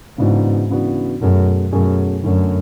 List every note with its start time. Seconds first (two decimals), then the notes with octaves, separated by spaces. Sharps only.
0.18 G#2 C#3 E3 B3 D4 F#4
0.70 C#3 E3 B3 D4 F#4
1.21 F#2 B2 A3 C#4 G#4
1.72 F#2 B2 A3 C#4 G#4
2.24 F#2 D3 A3 C#4